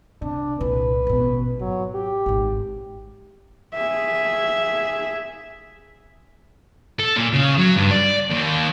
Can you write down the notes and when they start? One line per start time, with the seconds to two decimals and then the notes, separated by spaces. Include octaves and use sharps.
0.22 C3 D4
0.61 C2 A#2 B4
1.07 A1 B2
1.59 G#1 F#3
1.94 G4
2.26 G#1 G#2
3.74 G#4 E5
6.99 A4
7.16 A#2
7.33 C#3
7.58 F#3
7.76 G2
7.91 D5
8.30 D#2